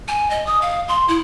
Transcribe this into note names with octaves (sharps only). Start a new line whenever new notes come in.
G#5
D#5
D#6
F5
C6
E4